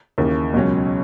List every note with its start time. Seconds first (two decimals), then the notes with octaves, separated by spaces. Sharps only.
0.18 D#2 C#3 E3 A#3
0.53 C#2 B2 F#3 C#4